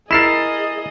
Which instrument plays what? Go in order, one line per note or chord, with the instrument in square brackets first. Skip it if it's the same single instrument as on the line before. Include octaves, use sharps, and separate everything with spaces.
[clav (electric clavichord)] E4 A#4 [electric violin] G#4 D#5 [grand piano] A6 C7 E7